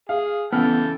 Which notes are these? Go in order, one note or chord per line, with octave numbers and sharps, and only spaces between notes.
G#4 F5
C#3 E3 B3 A4 G5 A5 F6